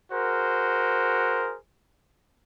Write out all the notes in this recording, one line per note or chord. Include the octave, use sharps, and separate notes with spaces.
F#4 G#4 A#4 C5